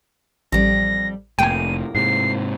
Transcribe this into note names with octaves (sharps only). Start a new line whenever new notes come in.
A1 F2 G3 A#6
F1 A2 A#3 G5 G#5 D#7
G#2 C3 C7